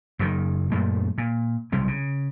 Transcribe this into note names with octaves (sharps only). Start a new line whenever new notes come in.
F#1 F#2 A2 D#3
F#2 A#2 G#3 A3
A#2
B1 C3 G3 G#3
C#3